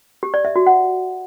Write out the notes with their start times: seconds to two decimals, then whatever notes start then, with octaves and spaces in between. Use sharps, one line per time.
0.23 G4
0.34 D5
0.45 E5
0.56 F#4
0.66 F#5